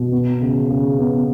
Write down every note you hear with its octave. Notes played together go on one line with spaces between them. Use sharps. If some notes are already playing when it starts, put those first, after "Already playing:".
Already playing: B2
B3
C#3
C#3
B3